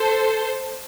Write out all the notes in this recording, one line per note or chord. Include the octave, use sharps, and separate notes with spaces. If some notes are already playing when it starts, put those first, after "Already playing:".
Already playing: A4 C5